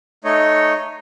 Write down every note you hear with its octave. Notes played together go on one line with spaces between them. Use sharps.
A3 D#4 C#5 D#5